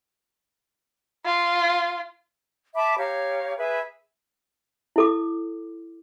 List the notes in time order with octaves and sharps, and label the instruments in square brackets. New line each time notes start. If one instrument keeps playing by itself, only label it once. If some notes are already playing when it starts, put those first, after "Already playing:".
[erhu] F4
[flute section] E5 A5 B5 D6
G4 C#5 F5 A#5
G#4 B4 E5 B5
[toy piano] E4 A4 D6